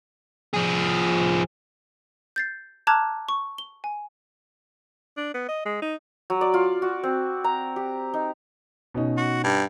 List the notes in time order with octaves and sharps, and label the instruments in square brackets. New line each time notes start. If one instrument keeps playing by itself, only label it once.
[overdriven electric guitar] F3 G#4
[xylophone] G6 A6 C7
A5 A#5 D6 F6 F#6 G#6
C#6
G7
G#5
[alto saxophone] D4
B3
D#5
G#3
D#4
[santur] F#3
D5
F4
F#4
C4
A#5
G4
D#4
[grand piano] B2 C#4 D#4
[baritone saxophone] F#4
G2